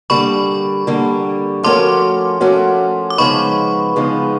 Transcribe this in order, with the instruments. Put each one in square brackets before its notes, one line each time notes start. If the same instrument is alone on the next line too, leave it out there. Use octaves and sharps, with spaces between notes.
[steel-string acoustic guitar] D3 G3 A#3 [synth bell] B5 C#6
[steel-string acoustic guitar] D3 G3 A#3
[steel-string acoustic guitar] F3 A3 C#4 F#4 A#4 [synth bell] C6 D6
[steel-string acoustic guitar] F3 A3 C#4 F#4 A#4
[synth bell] D6
[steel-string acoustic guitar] C#3 F3 G#3 B3 D#4 [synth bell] B5 C#6
[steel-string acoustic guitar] C#3 F3 G#3 B3 D#4